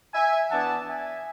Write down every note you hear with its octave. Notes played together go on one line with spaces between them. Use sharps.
E5 G#5
E3 B3 D4 F#5 A5
E5 G#5